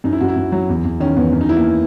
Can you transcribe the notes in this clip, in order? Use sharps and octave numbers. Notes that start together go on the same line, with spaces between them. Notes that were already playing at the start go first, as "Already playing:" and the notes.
F#2 D#4
E4
F#2 F#4
E4
F#2
F#3
E2
E2
D#3 C#4
E2 B3
F#2 C#4
D#4
E3 E4
A#3